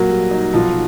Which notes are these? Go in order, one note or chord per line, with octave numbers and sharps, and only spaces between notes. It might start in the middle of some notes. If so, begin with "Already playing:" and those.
Already playing: A#2 F#3 A#3
G3
D#4
B1 F3